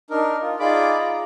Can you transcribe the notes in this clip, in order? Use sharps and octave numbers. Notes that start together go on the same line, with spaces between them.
D4 D#4 A#4
F4
D#4 F4 G#4 D5 B5 D6
A#5